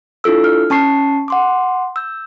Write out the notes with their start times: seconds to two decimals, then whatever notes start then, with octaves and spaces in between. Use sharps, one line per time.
0.24 D4 E4 F4 A4 E6
0.44 F6
0.70 C#4 A5 C#6 C7
1.28 F#5 C6 D6
1.96 E6 G6